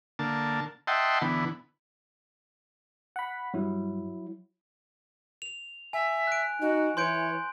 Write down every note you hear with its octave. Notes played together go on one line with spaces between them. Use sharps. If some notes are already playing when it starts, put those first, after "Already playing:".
D3 A#3 A5
D#5 E5 F#5 G5 A5 C6
D3 E3 B3
F#5 B5
G2 F#3 E4
F7
E5 G#5
F#6 D7
D#4 F#4
E3 C#5 C6 G6 D7